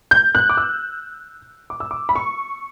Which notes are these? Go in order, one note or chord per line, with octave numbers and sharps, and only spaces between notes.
G6
F#6
D6
E6
D6
E6
D6
B5
C#6